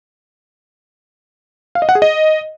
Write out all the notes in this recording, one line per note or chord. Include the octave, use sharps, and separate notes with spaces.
F5
D#5
F#5
G#4
D#5